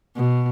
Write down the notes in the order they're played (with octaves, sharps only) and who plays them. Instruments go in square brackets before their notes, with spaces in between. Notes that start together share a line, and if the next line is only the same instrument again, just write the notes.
[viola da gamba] B2